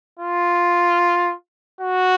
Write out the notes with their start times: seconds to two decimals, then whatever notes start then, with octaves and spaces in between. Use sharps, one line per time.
0.19 F4
1.81 F#4